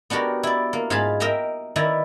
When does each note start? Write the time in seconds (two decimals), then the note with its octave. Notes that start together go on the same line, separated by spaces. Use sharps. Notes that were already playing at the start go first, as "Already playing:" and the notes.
0.10 B3 D4 F#4 G4 A#4
0.43 E4 D5
0.73 A#3
0.90 G#2 F4 G#4 F5 A5 B5
1.20 A#4 D#5 E5 G5 A#5
1.76 D#3 E4 B4 D5 A#5